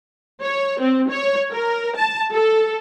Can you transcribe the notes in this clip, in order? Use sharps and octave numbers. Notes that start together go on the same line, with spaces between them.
C#5
C4
C#5
A#4
A5
A4